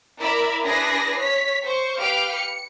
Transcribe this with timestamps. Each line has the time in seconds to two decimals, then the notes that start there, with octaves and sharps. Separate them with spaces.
0.19 E4 A#4 D5 E5 B5
0.64 D4 E4 G#4 B4 A#6 C7
1.19 C#5 B6
1.64 C5 C#6
1.99 G4 B4 F5 G5 F6 D7
2.33 C#7